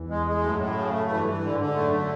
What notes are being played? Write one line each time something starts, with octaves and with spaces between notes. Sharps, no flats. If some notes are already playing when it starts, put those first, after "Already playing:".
Already playing: E2 E3
G#3
G#3
F#2 A2 F#3
A2
C#3
A3
G2 E3 G3
E3
G#2 D3 G#3
D3
F#2 F#3 A3
D3